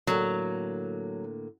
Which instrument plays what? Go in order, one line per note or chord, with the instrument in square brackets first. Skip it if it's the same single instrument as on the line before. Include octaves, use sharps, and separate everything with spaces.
[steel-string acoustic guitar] A2 D3 A#3 [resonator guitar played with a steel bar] F#3